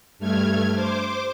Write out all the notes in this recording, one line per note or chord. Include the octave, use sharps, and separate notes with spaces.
G2 A3 F6 G#6
C5 D6